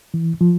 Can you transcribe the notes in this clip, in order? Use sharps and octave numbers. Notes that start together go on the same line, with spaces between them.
E3
F3